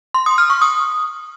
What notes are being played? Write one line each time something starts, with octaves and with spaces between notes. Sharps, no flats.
C6
D#6
F6
C#6
D#6